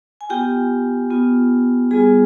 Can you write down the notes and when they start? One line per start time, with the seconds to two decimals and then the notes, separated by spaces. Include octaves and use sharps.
0.21 G#5
0.29 B3 F4 G4 G5
1.11 B3 F4
1.91 G3 B3 F4 G#4 G#5